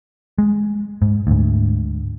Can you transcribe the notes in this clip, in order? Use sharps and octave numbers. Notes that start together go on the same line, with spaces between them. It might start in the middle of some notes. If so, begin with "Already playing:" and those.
G#3
G#2
D2 G#2